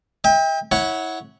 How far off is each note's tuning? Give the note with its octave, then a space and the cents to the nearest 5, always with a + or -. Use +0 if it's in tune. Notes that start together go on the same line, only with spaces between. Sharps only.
E5 -40 G5 +30
E4 -25 C#5 +0 F#5 +0